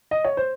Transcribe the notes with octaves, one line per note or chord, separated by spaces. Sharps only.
D#5
C#5
C5